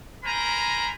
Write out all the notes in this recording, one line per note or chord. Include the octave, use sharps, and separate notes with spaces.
A#4 C5 G#5 A#5 B5